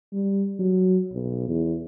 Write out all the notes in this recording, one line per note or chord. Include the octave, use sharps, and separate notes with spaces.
G3
F#3
B1
E2